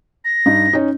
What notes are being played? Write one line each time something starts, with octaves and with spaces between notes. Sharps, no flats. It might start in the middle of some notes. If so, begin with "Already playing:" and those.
A#6
G2 D#4
C#4 D#4